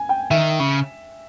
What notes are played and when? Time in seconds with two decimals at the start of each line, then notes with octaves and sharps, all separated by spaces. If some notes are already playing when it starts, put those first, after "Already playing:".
Already playing: G#5
0.09 G5
0.31 D#3 E5
0.59 C#3